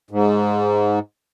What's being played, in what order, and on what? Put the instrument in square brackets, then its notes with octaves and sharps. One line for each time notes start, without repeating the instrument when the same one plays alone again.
[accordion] G#2